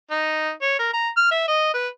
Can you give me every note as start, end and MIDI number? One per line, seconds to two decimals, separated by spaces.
0.11 0.51 63
0.62 0.76 73
0.79 0.90 70
0.93 1.09 82
1.17 1.30 89
1.31 1.46 76
1.48 1.74 75
1.74 1.88 71